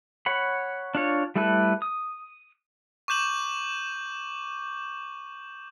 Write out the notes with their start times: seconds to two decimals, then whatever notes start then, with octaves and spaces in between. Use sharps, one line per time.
0.26 C#5 F#5 B5
0.95 D4 F4 C#5
1.36 G3 A3 E4 A4 B4
1.82 D#6
3.08 C#6 D6 G6 E7 F#7